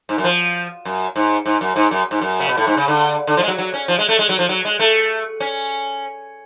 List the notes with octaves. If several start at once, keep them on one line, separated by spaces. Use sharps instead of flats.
G#2
F#2
F3
F#2
G#2
G#2
F#2
G#2
F#2
G#2
F#2
C#3
B2
A2
G#2
C#3
D3
D3
F3
G#3
F#3
F#3
C#4
F3
G#3
A3
G#3
F#3
F3
F#3
G#3
A3
C#4